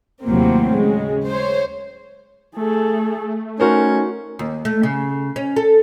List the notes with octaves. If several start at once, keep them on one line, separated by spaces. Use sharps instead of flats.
D#2 A2 C3 F#3 A#3 C4
C#3 G#3
C5 C#5
A3 G#4 A4
C#4 D#4 F#4 A#4 C5
D#2
A3
C#3
C#4
A4